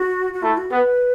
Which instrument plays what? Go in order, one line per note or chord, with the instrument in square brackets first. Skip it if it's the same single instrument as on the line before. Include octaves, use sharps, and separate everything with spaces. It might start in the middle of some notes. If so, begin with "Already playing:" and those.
Already playing: [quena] F#4
F#4
[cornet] A3 [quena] E4
[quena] F#4
[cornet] B3 [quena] B4